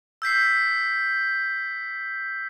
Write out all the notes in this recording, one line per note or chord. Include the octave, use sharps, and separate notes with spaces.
E6 G6 B6 C7